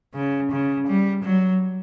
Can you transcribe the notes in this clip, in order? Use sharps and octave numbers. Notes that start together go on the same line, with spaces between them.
C#3
C#3
G3
F#3